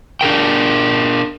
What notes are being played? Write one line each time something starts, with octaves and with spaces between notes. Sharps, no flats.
D4 G#4 A#4 G5